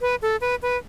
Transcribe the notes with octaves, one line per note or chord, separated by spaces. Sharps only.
B4
A4
B4
B4